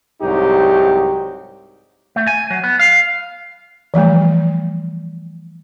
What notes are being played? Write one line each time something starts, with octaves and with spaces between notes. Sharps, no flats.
C2 G#2 F#3 D#4 G4
A3
G#5
F#3
B3
F5
E3 F3 G3 A3